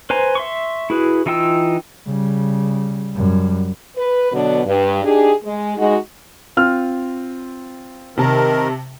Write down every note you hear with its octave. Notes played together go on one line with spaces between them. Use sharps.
B4 C5 G#5 A#5
E5 C6 C#6
E4 F#4 G#4 B4
E3 D#4 F4 G5 E6
C#3 G3
F#2 G3
B4
B2 D3 F#3 B3 D4
G2
D4 D#4 G4 G#4
G#3
G#3 D#4 F#4
C4 F4 F6
C3 D#3 A#4 A5